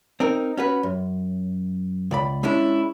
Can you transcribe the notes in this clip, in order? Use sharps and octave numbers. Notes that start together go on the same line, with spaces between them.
C4 D#4 A#4
C#4 F#4 B4
F#2
C#2 D5 B5
G#3 C#4 D4 E4